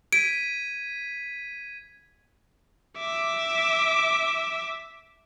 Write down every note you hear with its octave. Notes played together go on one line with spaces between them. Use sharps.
G#6 B6 D7 D#7
E5 D6